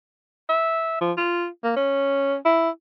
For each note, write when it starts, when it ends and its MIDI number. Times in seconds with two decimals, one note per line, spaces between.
0.49 0.98 76
1.01 1.12 53
1.17 1.47 65
1.64 1.72 58
1.76 2.36 61
2.45 2.70 64